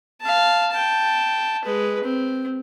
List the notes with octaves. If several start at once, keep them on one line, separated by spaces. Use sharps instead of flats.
F5 A5
G5 A5
G#3 B4
C4